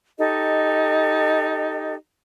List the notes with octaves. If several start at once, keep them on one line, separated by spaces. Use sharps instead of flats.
D#4 G4 A4 D#5